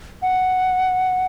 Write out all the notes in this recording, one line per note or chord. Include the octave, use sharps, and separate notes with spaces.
F#5